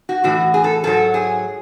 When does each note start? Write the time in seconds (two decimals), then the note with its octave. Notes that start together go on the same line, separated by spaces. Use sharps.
0.09 F#4
0.24 A2 E3 F#4
0.54 G#4
0.64 A4
0.84 G#2 F#3 A4
1.14 G#4